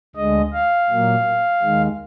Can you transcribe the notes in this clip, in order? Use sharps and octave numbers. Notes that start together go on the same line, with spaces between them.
D2 D3 G#3 D#5
F5
A#2 F#3 A#3
D#2 D#3 G#3